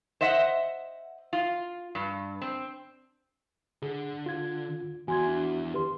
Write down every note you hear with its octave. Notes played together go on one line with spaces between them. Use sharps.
C5 D#5 E5 F#5
F4
G2
C4
D3 G#4
F4 G#6
E2 F#4 G#5 C6 G#6
D4
G4 B4 C6